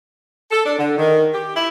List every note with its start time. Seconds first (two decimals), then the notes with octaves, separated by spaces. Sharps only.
0.51 A4
0.66 D4
0.79 D3
0.97 D#3
1.33 G4
1.56 E4